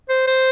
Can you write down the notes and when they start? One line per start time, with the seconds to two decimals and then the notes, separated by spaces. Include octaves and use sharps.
0.09 C5
0.28 C5